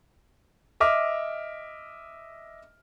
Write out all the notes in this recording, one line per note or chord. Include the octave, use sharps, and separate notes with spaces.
D#5 E5 D6 F6